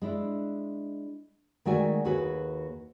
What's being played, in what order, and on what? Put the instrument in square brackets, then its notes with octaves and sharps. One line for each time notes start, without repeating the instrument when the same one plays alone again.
[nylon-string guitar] G#3 D4 E4
D#3 G#3 A3 F#4 D5 G#5
D#2 F#4 G#4 B4